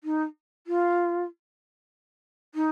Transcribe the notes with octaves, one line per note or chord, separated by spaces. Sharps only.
D#4
F4
D#4